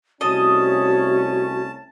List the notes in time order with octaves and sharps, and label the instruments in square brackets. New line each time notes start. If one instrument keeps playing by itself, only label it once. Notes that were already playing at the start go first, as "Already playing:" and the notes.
[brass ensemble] C2 A3 C#4 [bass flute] F#4 [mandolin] D#5 [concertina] A5